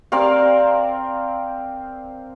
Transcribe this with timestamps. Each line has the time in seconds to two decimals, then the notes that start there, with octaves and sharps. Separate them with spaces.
0.12 C4 A#4 D5 F5